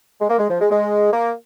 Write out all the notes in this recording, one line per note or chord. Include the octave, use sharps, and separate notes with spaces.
G#3
A#3
G#3
F3
G#3
G#3
A#3